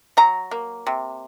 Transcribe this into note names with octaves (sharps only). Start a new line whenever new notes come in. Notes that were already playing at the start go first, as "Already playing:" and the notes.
F#3 A#5
A#3
C3